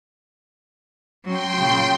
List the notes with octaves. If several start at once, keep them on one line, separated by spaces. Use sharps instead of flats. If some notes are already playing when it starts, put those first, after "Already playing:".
F#3 C#4 G5 C6
A#2 C#3